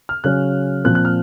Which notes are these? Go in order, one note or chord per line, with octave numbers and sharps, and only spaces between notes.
F6
C#3 F#3 C#4 F#6
A#2 F3 C4 F#6
F#6
F6